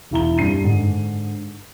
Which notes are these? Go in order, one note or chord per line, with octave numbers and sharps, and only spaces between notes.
E1 E4 A#5 G7
G2 C7 D#7
G#2 D3